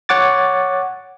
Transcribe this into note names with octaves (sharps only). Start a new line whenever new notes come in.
C#5 F#5 D6 A6